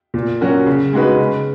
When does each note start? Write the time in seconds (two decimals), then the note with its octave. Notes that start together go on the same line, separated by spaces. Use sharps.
0.14 A#2
0.41 F#3 C#4 F#4 A#4
0.66 C#3
0.93 G#3 D#4 F#4 B4
1.19 C#3